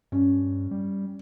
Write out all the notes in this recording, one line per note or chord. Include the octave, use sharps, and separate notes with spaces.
G2 C#4
G3